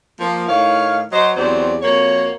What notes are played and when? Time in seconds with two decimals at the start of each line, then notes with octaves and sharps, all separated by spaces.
0.20 F3 A#3
0.48 A2 D#3 C#5 F5
1.11 F#3 C5 D#5
1.36 E2 F#3 C4 G4 C5 D5
1.82 F2 A#3 F#4 C#5